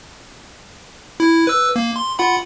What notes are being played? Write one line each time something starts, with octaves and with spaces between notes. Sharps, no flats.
E4
B4 E6
A#3
C6
F4 F#5 B5